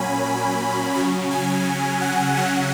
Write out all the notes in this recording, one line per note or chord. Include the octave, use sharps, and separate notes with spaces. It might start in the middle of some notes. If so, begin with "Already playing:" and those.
Already playing: A#2 F#3 A#3 C#4 G#5 B5
C#3 F#3 C#4
G#5
F#5
C#3 F#3 C#4 F#5